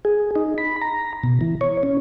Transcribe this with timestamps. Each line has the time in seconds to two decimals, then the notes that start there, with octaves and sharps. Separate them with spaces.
0.05 G#4
0.35 D#4
0.58 B5
0.81 A#5
1.23 B2
1.41 E3
1.61 C#5
1.83 C#4